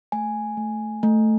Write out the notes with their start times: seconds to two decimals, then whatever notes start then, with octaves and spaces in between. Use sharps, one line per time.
0.12 A3 G#5
0.57 A3
1.03 A3